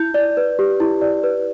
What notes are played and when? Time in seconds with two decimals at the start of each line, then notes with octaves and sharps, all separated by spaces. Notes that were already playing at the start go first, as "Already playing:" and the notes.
Already playing: E4 G6
0.14 D5
0.37 B4
0.59 G4
0.80 E4
1.01 D5
1.23 B4